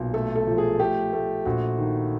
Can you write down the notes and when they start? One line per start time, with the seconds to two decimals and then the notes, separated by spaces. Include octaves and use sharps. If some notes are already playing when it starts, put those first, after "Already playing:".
Already playing: B1 A#2
0.14 A3 A4
0.36 A4
0.47 F3
0.58 G#4
0.80 A3 G4
1.13 A3
1.45 A#1 F#4
1.79 D#3